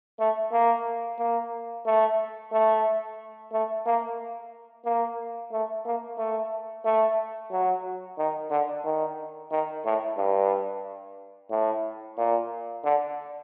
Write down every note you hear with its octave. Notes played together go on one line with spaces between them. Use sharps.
A3
A#3
A#3
A3
A3
A3
A#3
A#3
A3
A#3
A3
A3
F#3
D#3
D3
D#3
D#3
A2
G2
A2
A#2
D3